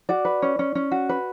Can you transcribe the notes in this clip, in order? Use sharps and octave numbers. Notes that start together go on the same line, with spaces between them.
F#4 D5
B4
C#4
C#4
C#4
F#4
B4